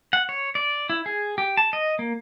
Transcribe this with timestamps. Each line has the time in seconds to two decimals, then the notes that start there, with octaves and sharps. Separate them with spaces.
0.13 F#5
0.29 C#5
0.55 D5
0.90 E4
1.06 G#4
1.38 G4
1.57 A5
1.73 D#5
1.99 A#3